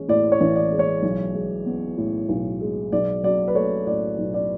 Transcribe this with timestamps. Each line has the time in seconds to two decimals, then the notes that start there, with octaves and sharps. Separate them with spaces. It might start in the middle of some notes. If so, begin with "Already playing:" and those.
Already playing: A1 G#3 C#4
0.08 A2 D5
0.32 C#5
0.41 A1
0.56 D5
0.72 G#3
0.79 C#5
1.03 B1
1.34 G#3
1.66 B3
1.98 A2
2.29 B1
2.61 G#3
2.92 B1 D5
3.23 F#3 D5
3.48 B4
3.55 A3 C#5
3.86 A2 D5
4.19 B1
4.34 D5